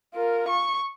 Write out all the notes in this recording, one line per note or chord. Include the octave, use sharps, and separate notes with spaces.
F4 A#4
C#6